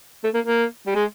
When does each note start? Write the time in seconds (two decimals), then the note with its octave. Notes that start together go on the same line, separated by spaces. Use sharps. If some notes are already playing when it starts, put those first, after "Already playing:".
0.24 A3
0.35 A#3
0.46 A#3
0.87 G3
0.95 G#3